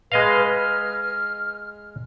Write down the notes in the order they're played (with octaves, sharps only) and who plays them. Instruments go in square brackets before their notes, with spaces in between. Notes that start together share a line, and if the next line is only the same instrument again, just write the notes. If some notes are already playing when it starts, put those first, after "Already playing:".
[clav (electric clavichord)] G#3 D#5 F5 [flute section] B4 F6
[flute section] F6